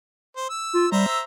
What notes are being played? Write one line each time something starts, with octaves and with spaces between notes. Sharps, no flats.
C5
E6
F4
G3 C5 E5 A#5
E6